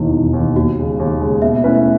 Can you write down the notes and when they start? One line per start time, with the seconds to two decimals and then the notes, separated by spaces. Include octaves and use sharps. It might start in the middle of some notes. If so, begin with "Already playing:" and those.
Already playing: E1 D#2 D#3 E4
0.13 E1
0.33 D#2 D#3
0.55 D#2 F#4
0.78 C#3 G#3
0.99 D#2
1.20 G#3
1.25 C#3
1.42 B2 E5
1.64 A3 C#4 E4 B4
1.75 E5